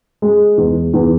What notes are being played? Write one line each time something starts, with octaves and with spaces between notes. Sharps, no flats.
G#3
E2
E2